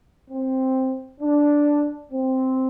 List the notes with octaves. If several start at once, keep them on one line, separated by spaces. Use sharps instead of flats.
C4
D4
C4